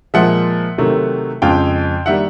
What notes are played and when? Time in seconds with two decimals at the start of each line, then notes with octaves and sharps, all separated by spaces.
0.14 A#2 F3 G#3 E5 F#5
0.78 C3 D#3 F#3 A3
1.42 F2 C#3 F3 G#3 F5 G5
2.06 D#3 G3 A#3 E5 F#5